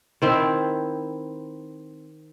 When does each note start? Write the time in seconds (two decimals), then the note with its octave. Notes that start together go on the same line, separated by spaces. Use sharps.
0.22 D#3 C4 E4